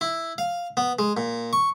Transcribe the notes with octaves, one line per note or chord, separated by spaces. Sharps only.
E4
F5
B3
G#3
A#2
C#6